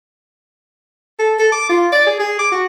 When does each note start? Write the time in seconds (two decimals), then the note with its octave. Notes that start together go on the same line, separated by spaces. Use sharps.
1.19 A4
1.39 A4
1.52 D6
1.69 F4
1.92 D5
2.07 G#4
2.20 G#4
2.39 D6
2.52 F#4